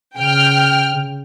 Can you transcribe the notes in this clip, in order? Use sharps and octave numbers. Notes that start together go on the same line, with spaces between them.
C#3 G5 F6